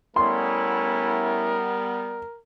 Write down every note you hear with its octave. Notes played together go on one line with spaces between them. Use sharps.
G3 A3 B3 C#4 E4 A#4 C6